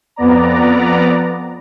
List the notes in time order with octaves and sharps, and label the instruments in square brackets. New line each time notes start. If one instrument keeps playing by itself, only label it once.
[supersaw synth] F2 B3 D5 A#5